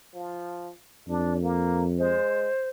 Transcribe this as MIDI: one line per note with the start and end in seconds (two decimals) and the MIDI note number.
0.14 0.72 53
1.08 2.18 41
1.08 1.41 62
1.42 1.85 58
1.98 2.48 56
1.98 2.69 72